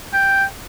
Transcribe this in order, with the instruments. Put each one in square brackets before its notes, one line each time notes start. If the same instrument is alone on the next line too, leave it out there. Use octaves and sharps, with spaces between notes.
[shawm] G5